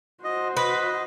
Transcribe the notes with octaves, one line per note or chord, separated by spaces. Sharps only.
F#4 C5 D#5
B4 D#5